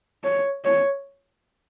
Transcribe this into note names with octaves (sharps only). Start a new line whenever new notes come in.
C#5
C#5